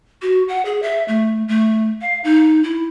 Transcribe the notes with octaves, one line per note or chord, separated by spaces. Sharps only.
F#4
F#5
G#4
E5
A3
A3
F5
D#4
E4